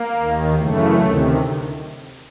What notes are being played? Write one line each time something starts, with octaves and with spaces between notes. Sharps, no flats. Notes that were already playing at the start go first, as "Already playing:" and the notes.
Already playing: A#3
D#2 D#3
F#2 C#3 E3 A3
D2 C3 D#3